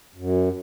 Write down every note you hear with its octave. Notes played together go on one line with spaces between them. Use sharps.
F#2